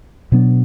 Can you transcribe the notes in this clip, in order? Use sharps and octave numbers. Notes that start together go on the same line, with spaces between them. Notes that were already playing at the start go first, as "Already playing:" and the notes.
B2 F#3 B3 D4